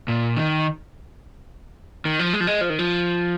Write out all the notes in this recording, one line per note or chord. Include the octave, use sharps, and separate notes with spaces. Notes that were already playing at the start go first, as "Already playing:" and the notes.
A#2
D#3
D#3
F3
G#3
F3
G#3
F3
D#3
F3